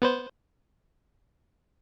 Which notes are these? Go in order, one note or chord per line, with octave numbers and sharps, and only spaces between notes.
B3 B4 C5